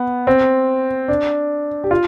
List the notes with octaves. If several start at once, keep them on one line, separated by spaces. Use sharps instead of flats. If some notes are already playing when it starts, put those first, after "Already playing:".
Already playing: B3
C4
D4
G4
F4